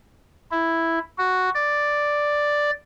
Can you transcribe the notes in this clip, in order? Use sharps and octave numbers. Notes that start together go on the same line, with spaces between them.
E4
F#4
D5